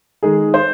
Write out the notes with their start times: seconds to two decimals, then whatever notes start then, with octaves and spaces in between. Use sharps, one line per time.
0.23 D#3 G#3 D#4 G#4
0.54 C5